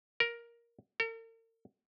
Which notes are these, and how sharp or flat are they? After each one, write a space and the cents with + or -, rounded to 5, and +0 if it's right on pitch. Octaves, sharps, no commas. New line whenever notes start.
A#4 +10
A#4 -45